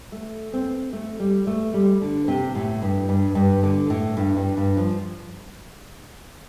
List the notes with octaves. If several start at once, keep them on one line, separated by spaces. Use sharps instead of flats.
A3
C4
A3
G3
A3
G3
D3
C3
A2
G2
G2
G2
D3
A2
G2
G2
G2
F3